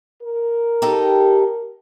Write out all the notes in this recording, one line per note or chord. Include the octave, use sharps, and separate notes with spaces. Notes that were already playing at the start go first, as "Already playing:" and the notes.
A#4
D#4 G4 A4